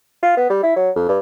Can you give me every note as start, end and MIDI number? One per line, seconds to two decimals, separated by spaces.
0.22 0.34 65
0.37 0.45 59
0.50 0.61 55
0.63 0.73 64
0.76 0.90 54
0.96 1.07 41
1.08 1.19 43